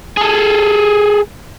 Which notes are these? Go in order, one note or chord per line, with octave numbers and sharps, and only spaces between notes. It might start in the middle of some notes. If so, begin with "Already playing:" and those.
G#4 A4